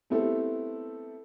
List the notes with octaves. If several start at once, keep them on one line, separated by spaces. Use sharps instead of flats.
A3 B3 C4 E4 G4 A4